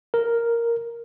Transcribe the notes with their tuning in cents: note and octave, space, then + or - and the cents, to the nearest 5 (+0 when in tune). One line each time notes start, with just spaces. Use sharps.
A#4 +0